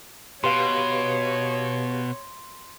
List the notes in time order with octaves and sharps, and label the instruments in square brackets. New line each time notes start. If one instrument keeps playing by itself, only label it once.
[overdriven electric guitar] B2 [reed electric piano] G4 B4 F5 [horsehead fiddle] C#5 [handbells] C6